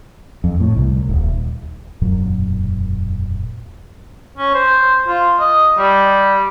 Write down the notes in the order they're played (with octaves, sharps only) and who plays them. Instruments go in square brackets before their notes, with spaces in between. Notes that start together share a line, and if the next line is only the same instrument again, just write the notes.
[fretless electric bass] F2
A2
C2
D#1
[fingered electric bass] E1 F#2 A#2 F#3
[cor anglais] C#4
C5
F4
D#5
G3